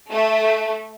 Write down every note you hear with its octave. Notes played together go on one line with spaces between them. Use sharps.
A3